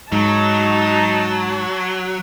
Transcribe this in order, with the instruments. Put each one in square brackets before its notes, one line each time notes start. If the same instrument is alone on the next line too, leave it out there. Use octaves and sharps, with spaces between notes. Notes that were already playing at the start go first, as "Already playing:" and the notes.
[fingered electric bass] G#2 [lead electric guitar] F#3 [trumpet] D#4 [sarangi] A5